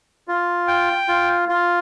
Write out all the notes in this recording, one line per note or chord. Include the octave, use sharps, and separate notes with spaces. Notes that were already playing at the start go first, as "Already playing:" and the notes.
F4
G5
F4
F4